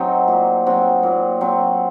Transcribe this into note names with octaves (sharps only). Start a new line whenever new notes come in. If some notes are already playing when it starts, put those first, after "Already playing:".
Already playing: F#3 C4 D#4
A#2
F#3 C4
A#2
F#3 C4